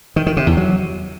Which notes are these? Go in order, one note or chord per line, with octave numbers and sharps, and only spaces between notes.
D#3
D#3
C3
E2
F#3